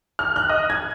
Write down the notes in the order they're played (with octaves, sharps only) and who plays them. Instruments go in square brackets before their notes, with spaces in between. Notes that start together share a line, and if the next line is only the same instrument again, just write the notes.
[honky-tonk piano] F6
F#6
D#5
G#6